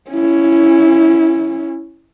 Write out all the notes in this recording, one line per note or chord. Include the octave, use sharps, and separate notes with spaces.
C#4 E4